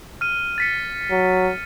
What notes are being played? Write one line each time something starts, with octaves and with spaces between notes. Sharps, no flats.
F6 D#7
A6 B6 C#7
F#3